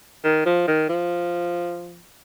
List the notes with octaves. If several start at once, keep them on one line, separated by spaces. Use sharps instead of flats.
D#3
F3
D#3
F3